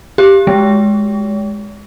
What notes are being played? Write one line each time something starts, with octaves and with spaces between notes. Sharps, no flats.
G4
G#3